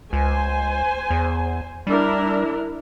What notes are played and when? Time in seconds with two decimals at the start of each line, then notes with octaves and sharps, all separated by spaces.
0.13 C#2 C5 G#5
1.10 E2
1.87 G3 D4 E4 A#4